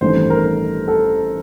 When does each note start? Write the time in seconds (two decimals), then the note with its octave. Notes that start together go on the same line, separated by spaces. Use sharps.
0.01 A1 G2 D#3 A3 C4 C5
0.30 A#4
0.88 A4